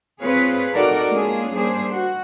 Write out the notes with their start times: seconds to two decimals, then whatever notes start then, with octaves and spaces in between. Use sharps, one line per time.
0.21 C4 F4 G#4 B4 C#5
0.74 D#4 F#4 A4 A#4 D5
1.09 G#3 A#3 C#4 D4 F4 G#4
1.53 G3 A#3 D4 G#4 C5
1.92 F#4